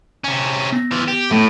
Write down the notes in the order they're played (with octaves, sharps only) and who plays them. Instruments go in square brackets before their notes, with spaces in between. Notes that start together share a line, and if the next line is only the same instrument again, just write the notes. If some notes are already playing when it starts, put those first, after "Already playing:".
[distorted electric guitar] C3 C#4
[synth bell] B3 A#6
[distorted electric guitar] E3 F4
G4
[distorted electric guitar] A2 [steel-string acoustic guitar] A3